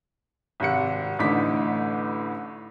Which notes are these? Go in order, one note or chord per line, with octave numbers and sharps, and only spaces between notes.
G#1 C3 F#5 C#7
A1 A2 D3 D#4 D6 B6